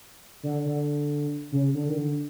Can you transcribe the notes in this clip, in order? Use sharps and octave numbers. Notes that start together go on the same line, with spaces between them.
D3
D3
C#3
D3
D#3
D3